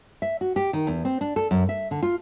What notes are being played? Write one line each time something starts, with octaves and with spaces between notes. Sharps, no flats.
E5
F#4
G4
D#3
E2
C4
D4
A4
F#2
E5
D3
F4